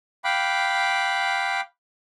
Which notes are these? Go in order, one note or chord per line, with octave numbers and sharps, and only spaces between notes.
F5 G5 B5 D6 F#6